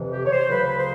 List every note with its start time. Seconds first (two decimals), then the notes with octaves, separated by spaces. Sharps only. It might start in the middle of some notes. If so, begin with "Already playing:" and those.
Already playing: F2 C3 E3
0.13 G4
0.26 C#5
0.32 C5
0.50 D2 C#3 F#3 B4
0.79 C5